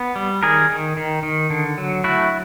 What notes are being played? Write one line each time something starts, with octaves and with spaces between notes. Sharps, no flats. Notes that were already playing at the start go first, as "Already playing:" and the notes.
Already playing: B3
G3
D#3 G#4 A#4
D#3
D#3
D#3
D3
F#3
A3 E4 F#4